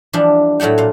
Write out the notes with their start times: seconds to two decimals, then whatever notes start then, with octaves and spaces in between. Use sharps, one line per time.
0.13 E3 F3 G3 D4
0.60 A2 F#3 A3 F#5 G5
0.78 A#2 F5